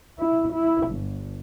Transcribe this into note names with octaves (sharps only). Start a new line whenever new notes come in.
E4
E4
G1